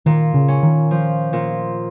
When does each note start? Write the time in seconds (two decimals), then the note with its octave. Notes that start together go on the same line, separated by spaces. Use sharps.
0.06 A#2 D#3
0.34 C#3
0.48 C#4
0.63 D#3
0.91 F3
1.33 A#2